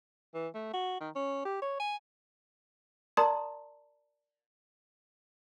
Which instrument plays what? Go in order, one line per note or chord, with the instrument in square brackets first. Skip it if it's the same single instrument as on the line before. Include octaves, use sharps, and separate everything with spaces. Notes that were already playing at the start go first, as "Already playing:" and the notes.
[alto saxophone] E3
A3
F#4
D#3
C#4
G4
C#5
G#5
[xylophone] A#4 D5 A5 A#5 C6 D#6